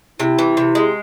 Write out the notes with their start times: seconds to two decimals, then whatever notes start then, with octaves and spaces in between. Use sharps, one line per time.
0.19 C3 E4
0.39 E3
0.57 C3
0.75 G#3